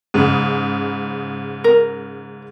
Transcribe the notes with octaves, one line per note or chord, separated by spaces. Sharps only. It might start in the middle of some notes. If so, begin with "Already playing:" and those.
G#2 C#3
A#4